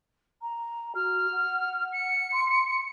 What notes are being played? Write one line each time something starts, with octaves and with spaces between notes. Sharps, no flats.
A#5
F#4 F6
F#5
C#7
C6